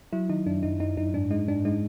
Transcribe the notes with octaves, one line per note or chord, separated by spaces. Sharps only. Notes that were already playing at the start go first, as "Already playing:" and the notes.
F#3 E4
D#3 D#4
F#2 D4
F#2 D#4
F#2 D#4
F#2 D#4
G#2 D4
G#3 D#4
G#2 D4
G#3 D#4